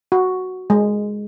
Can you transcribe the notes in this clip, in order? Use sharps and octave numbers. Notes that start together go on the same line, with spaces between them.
F#4
G#3